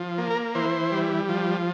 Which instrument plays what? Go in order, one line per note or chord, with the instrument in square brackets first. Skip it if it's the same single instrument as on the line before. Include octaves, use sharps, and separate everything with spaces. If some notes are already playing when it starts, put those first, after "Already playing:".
Already playing: [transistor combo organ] F3
A#3
A#4
E3 C5
G3
F3